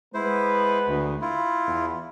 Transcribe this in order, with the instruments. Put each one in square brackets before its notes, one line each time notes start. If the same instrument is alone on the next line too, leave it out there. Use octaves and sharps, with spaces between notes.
[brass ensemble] G#3 B3 B4 [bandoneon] E4 C5
[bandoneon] D2
E4 F4
[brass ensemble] E2